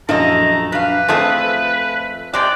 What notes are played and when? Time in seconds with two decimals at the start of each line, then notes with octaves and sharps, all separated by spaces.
0.09 A#1 F#2 F3 A3 A4 D#5 A#5
0.72 D4 B4 F5
1.08 F2 A3 C4 F4 G#4 C5 E5 A5
2.34 C3 G#3 G4 D5 F#6